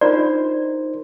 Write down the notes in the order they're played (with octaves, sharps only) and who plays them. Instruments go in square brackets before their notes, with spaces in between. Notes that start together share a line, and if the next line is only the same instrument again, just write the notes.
[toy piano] D4 F4 D5 [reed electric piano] D#4 A#4 C5